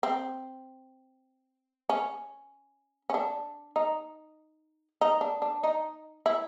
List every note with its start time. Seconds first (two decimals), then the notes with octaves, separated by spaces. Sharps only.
0.03 C4
1.89 C#4
3.10 C#4
3.14 D4
3.76 D#4
5.01 D#4
5.21 D4
5.42 D4
5.63 D#4
6.26 E4